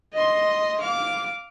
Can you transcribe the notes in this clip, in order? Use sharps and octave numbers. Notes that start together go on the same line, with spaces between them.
D#5 C6
F5 D6